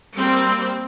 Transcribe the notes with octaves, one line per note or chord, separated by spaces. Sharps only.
G3 A#3 C4